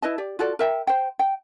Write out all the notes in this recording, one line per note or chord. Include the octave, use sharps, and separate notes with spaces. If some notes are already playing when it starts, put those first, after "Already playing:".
E4 B4 D#5 A5
G4 D5
F4 F#4 A4 D5
A#4 E5 G5
C5 G5
G5